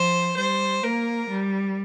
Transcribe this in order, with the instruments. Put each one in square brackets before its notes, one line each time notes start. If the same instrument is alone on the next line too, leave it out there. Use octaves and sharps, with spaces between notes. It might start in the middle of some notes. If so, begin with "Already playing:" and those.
Already playing: [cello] F3 [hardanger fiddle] C5
[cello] G3 [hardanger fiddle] C5
[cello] A#3 [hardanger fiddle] A#4
[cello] G3